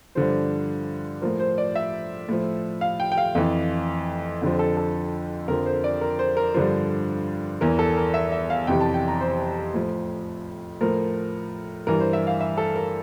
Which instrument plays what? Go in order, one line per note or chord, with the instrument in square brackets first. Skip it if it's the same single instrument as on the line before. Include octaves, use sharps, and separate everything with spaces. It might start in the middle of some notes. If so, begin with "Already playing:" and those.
[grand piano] G2 D3 F3 C5
A2 F3 A#4
C5
D5
E5
A2 F3
F5
G5
G5
F5
F2 E3
F2 D3 F3
A4
A4
F2 D3 F3 A#4
C5
D5
A#4
C5
A#4
G2 D3 F3 C5
E2 E3 A#4
A4
A#4
E5
E5
F5
F2 C3 E3 G5
A5
G5
A#5
C5
A2 F3
A2 F3 A#4
G2 E3 A#4
C5
E5
F5
E5
A4
A#4